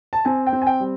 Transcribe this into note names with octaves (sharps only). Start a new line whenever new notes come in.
A5
C4 G#5
G5
C4
G#5
G5
G3